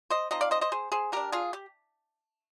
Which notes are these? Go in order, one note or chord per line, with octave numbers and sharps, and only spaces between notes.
C5 D#5
F3 C4 D#4 C5 D#5
D5 F5
C5 D#5
C5 D#5
G#4 C5
G#4 C5
G3 D4 G4 A#4
F4 G#4
G4